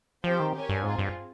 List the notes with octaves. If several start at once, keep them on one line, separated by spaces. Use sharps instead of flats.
F3 C4 G4 C5 G5
D#3
G4 A#4 C#5 G#5
G2
G#2 C4 F4 G#4
G2